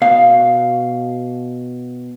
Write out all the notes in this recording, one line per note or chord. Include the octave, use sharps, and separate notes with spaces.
B2 F5